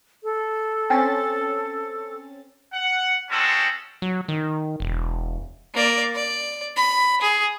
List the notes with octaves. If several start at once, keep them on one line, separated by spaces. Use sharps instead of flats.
A4
C4 C#4 A6
F#5
G#3 C4 C#4 F#4 A4
F#3
D#3
E1
A#3 D5
D5
B5
G#4